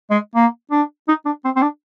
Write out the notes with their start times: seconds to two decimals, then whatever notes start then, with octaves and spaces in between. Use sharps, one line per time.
0.10 G#3
0.35 A#3
0.71 D4
1.08 D#4
1.25 D4
1.44 C4
1.56 C4
1.62 D4